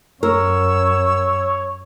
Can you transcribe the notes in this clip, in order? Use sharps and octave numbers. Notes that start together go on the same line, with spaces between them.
F#2 A#4 C#5 E6